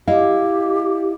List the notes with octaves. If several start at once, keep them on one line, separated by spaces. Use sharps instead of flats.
E4 G4 D#5 F5